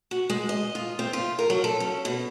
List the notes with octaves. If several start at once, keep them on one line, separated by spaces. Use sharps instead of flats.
F#4
G#3
D#5
F4
C4
F4
A#4
F#3
A4
C#4
B2